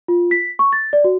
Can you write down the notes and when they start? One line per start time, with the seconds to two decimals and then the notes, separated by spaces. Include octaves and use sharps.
0.08 F4
0.31 B6
0.59 C#6
0.73 A6
0.93 D5
1.04 F#4